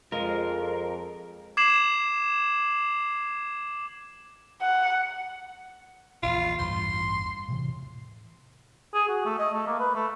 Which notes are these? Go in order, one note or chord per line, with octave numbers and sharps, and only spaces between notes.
F2 G#3 F4 A#4
D6 G#6 C7 E7 F#7
F#5
A#1 E2 F4
A1 E2 G2 C6
A2 C3 E3
G#4
F#4
A3
D#5
A3
A#3
B4
A3